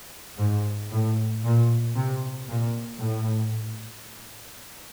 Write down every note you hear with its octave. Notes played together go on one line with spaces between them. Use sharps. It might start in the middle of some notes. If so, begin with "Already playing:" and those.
G#2
A2
A#2
C3
A#2
A2